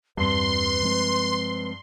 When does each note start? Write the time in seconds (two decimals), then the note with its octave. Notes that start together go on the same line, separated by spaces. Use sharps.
0.17 E2 G2 C4 B4 C6
0.83 F3 G#3 C4